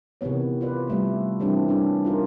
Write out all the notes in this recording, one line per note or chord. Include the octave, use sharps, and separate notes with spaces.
C3 D#3 E3 B3 C#5
F4 B4 D5
G3 A3 F4
D#3 E3 G3 C4 D4
G3 C#4 D4 G4
D#4 F4 A#4